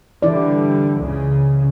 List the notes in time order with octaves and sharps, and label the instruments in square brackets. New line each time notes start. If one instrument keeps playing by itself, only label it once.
[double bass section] D3 G3 [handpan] E3 E4 D5
[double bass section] C#2 C#3